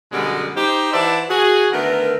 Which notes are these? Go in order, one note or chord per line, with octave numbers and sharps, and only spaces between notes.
F#2 B2 D3 G3 G#3 B3
D#4 G4 C5
E3 C5 D5 E5 F#5 A5
F#4 G#4
D3 D#3 A3 B3 A#4